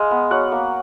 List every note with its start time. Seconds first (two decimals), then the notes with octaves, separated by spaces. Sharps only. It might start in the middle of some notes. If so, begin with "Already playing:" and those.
Already playing: G#3 F5
0.11 B3
0.31 F#3 F#5
0.52 A#3